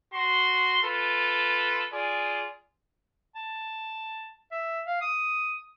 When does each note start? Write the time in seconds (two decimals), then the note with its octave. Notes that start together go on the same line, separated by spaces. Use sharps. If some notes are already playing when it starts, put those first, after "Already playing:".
0.14 F#4 C6
0.83 F4 A4 B4
1.93 F4 G#4 D5
3.35 A5
4.51 E5
4.86 F5
5.01 D#6